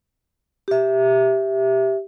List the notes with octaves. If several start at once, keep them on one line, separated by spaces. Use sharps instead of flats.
G4 E5